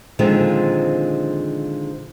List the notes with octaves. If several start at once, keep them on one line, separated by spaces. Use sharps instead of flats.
A#2 D3 D#3 F3 G#3 C4